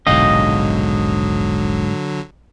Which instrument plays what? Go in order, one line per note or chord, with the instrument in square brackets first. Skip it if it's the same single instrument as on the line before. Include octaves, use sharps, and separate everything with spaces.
[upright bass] E1 A#1 [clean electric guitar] G#2 F5 G5 [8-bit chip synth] D3 F#3 [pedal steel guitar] D#5